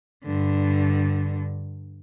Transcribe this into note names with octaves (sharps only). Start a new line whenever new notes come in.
G2 D3